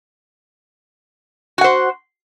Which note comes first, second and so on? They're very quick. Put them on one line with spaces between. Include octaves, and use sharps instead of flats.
F#4 F#5 C5